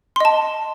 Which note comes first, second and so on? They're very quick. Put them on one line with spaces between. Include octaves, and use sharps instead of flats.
C6 D#5 A5